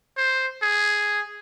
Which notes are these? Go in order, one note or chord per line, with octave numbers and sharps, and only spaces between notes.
C5
G#4